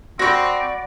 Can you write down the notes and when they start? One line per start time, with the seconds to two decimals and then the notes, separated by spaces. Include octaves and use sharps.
0.19 C4 F#4 D5 B5 C#6 A#6